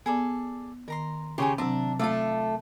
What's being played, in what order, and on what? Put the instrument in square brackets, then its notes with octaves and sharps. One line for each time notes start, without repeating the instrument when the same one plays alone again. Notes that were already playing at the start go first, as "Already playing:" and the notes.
[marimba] B3 [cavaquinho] G#4 A4 D5
[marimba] D#3 [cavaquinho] A#4 A#5 C6
[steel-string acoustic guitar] C#3 G4 [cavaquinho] G#4 C#5 C6
[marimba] C3 F#3 C4 [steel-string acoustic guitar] D4 [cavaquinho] E5 A#5
[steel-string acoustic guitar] A3 A4 [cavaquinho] F4 D5 F5 [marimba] E6